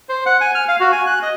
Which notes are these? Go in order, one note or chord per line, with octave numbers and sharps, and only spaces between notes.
C5
F#5
G#5
F6
F5
F#4
G#5
F#6
D#5